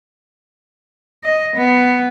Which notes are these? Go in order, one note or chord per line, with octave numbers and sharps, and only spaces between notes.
D#5
B3